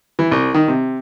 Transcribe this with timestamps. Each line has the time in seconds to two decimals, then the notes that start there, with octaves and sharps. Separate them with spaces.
0.19 E3
0.31 C2
0.54 D#3
0.68 C3